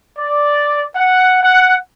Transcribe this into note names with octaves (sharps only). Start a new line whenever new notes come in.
D5
F#5
F#5